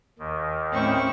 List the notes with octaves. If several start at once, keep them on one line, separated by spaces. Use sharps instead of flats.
D#2 D#3
A2 C4 C#4 E4 C#6